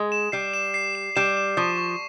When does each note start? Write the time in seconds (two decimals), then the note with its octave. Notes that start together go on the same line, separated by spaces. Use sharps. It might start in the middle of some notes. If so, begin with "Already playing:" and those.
Already playing: G#3
0.12 E7
0.32 G3 C7
0.54 E7
0.74 C7
0.95 E7
1.16 G3 E7
1.37 E7
1.57 F3 C#6
1.78 C#6